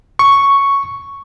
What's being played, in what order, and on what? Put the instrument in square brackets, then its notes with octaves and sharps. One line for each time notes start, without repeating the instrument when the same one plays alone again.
[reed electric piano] C#6